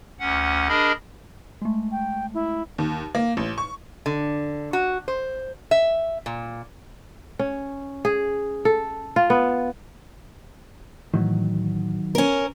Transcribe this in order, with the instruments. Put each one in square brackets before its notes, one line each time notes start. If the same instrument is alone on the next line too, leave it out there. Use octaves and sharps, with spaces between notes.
[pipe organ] D2 C#4 F#5
D4 G#4 A#4 D#5 B5
[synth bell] G#3 A3
[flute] G5
E4
[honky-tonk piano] D#2
A#3
A1
C#6
[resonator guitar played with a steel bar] D3
F#4
C5
E5
A#2
[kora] C#4
G#4
A4
F4
B3
[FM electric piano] A2 E3 [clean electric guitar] D#3 F#3
[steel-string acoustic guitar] C#4 A#4